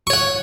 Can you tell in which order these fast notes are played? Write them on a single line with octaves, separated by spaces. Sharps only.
C#6 C#5 F#5